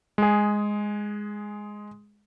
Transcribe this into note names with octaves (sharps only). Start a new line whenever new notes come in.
G#3 G#4